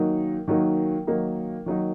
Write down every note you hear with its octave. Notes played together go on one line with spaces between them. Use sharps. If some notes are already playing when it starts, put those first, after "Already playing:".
Already playing: D#3 F#3 A#3 D#4
D#3 F#3 A#3 D#4
D#3 F#3 A#3 D#4
D#3 F#3 A#3 D#4